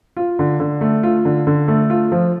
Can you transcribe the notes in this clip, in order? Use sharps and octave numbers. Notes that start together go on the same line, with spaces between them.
F4
D3
D3
A3
F4
D3
D3
A3
F4
F3